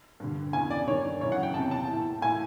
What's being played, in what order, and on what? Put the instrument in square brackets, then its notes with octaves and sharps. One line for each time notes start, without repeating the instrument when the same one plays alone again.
[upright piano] G2 D3
E2 C#3 E3 G#5
D5
G2 D#3 C#5
F#2 C#3 E3 C#5
F#5
G5
E2 C3 E3 A5
A5
E3
A2
A2 E3 G#5